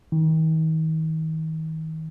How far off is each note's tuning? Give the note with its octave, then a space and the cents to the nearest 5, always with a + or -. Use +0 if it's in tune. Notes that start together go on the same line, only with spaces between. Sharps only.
D#3 +40